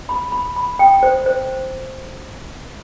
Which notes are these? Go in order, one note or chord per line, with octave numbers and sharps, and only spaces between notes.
B5
B5
B5
G5
C5
C5